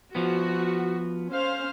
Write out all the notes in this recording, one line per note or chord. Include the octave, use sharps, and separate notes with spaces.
F3 B3 F#4
C#4 C5 F5